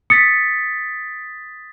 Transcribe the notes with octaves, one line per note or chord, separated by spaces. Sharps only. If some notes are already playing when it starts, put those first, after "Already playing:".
D#6 A6 B6 C#7